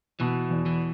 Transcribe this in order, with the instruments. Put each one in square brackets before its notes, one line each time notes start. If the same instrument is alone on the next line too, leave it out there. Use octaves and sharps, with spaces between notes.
[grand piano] B2 [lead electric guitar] E3
[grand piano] E2
[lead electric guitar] E3